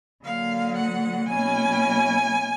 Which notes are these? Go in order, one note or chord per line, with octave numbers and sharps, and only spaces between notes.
D3 F#3 A#3 F5
F#5
B2 F#3 A#3 C#4 E4 G#5